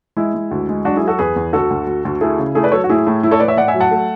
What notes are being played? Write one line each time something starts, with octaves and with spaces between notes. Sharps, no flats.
G#3 E4
G#3
D2
G#3
F#3 D4 F#4
E4 G#4
F#3
F#4 A4
E2 G#4 B4
E2
D2 F#4 A4
D2
D2
D2
A3 E4 G#4
C#3
A3 E4 G#4
B4 D5
F#3 A4 C#5
F#4
A2 E4 G#4
A2
A2 E4
A4 C#5
A2 B4 D5
C#5 E5
A2 D5 F#5
E5 G#5
F#3
F#5 A5
A3